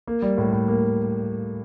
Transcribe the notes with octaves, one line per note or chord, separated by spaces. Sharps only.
A#3
G3
A2
A2
A#3